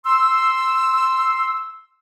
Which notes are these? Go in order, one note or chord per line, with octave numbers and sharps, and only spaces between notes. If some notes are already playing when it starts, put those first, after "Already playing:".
C6 E6